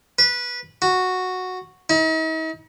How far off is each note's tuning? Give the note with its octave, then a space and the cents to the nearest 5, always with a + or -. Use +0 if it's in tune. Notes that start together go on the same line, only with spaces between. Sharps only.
B4 -15
F#4 -5
D#4 +45